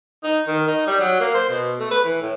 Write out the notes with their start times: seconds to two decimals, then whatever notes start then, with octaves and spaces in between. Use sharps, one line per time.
0.23 D#4
0.47 D#3
0.67 D#4
0.87 G3
1.00 F#3
1.20 A#3
1.34 C5
1.50 B2
1.79 A3
1.91 B4
2.04 E3
2.21 A2